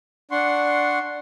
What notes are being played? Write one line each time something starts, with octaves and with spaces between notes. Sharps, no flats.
D4 F#5 C6 C#6